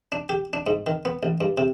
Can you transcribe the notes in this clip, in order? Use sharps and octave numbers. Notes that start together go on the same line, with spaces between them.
D4
G4
D4
G#2
D#3
B3
A1
G2
C3